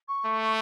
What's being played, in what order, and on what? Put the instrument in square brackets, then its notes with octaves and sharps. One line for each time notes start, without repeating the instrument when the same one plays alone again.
[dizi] C#6
[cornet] A3